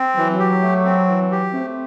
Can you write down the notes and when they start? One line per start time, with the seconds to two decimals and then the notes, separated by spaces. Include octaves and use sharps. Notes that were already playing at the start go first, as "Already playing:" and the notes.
Already playing: C4
0.17 E3 F#3
0.39 G4
0.62 A3
0.85 C4
1.08 E3
1.31 G4
1.53 A3 C4